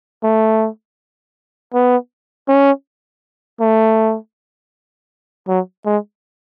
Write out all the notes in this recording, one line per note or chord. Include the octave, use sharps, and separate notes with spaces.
A3
B3
C#4
A3
F#3
G#3